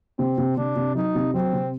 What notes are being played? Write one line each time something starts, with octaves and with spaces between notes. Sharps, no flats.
C3 C4
C3
C3 D4
C3
F#3 D#4
C3
F#3 C4
C3